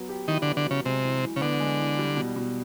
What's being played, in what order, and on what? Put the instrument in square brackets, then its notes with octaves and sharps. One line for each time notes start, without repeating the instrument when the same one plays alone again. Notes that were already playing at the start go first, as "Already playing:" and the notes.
Already playing: [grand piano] F#3 B3
G4
[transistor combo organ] D#3 [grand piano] E4
[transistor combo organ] D3
[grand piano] B3
[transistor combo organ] D3
[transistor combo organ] C#3 [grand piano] F#3
[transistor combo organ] C3 [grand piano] G#3
[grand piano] E3
E3
[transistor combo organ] C#3
[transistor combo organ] D3 [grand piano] B3
[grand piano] G#3
E3
G3
B2
B2